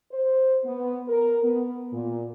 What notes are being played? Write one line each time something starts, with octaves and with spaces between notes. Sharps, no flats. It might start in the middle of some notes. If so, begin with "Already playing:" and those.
C5
B3
A#4
B3
A#2